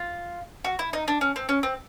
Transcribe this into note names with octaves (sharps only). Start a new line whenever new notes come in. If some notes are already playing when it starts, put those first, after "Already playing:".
Already playing: F4
F#4
E4
D#4
D4
C#4
C4
C#4
C4